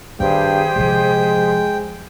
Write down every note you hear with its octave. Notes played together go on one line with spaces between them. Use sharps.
G2 D#3 B3 G4 G#4 C5 G5
C3 F3 G#3